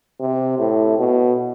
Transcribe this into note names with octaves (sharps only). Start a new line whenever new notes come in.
C3
A2
B2